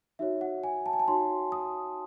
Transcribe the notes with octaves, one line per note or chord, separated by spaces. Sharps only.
D#4 F#4 C#5 E5
F#5
G#5
A5
G#5
A5
D#4 F#4 C#5 C6
D#6